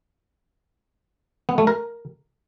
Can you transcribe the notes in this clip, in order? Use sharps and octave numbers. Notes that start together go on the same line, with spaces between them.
B3
A3
A#4